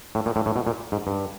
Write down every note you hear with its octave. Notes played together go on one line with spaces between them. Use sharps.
A2
A#2
A2
A2
B2
A#2
G#2
G2